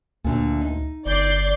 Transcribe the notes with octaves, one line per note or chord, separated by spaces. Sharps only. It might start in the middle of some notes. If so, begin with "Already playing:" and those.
D2 A#2 D3 A3
D#4
G1 D5 G6 C7